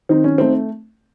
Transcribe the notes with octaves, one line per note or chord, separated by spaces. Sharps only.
D#3 C4 D#4
C#4
A3 C4 D#4